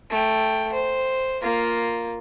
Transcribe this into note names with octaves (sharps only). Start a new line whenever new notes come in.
A3 G5
C5
A#3 F4